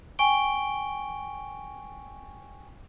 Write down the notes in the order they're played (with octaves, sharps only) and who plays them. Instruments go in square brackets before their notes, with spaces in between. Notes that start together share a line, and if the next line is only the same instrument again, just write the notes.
[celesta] G5 G#5 C#6 D7 G7